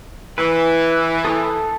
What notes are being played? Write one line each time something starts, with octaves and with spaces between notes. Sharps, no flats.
E3 B4
A4 D#6